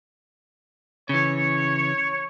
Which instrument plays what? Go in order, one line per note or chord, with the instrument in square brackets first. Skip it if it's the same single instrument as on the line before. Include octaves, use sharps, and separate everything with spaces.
[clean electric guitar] C#3 E3 [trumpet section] C#5